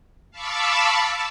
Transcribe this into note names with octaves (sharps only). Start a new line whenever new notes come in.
F5 A5 B5 C#6 D6 E6